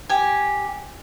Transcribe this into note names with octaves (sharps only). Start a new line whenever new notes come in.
G4 G#5